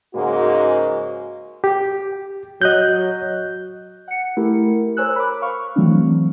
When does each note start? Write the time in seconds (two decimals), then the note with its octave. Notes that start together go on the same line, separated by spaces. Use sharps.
0.14 G#2 C#3 G#3 A#3 F#4
1.64 G4
2.62 F#3 D#5 F#6 G6
4.08 F#5 C#7
4.37 A3 E4 G4 A#4
4.97 A#4 C5 C#5 G#5 E6 F#6
5.16 B5 D6
5.42 F5 C#6 F6
5.76 E3 F#3 A3 C4 D4